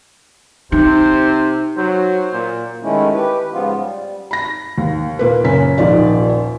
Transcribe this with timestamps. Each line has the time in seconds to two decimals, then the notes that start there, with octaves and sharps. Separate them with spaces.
0.72 C3 D#4 C5
1.77 F#3 C5
2.33 A#2
2.83 D#3 G#3 A3 C#4 E4
3.14 G4 B4
3.53 G#2 C#3 F3 B3 F4
3.78 G3
4.31 B5 A#6
4.78 D#2
5.19 A#2 A#3 B4
5.44 F#1 C#4 B6
5.78 D#1 A#1 F3 D#4 D5